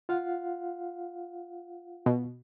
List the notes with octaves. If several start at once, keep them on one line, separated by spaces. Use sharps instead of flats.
F4 F5 F#5
B2